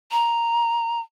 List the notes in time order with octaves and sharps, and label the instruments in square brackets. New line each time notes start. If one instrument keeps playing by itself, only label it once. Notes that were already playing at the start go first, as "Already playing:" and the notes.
[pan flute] A#5